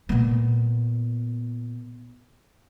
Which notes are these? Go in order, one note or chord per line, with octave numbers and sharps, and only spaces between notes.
A#2 B3